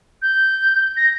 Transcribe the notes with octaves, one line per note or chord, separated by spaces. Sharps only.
G6
A#6